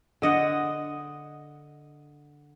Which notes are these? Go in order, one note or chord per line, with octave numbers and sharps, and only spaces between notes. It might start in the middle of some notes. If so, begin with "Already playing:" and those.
D3 D#5 F#5